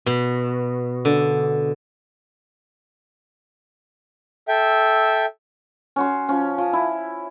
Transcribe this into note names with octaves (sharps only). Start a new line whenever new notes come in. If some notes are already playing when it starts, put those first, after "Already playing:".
B2
D3
A4 E5 G5
C#4 F#4 C6
F3 C#4
F3
E4